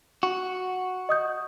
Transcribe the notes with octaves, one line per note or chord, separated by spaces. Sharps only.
F#4
D#5 D#6 G6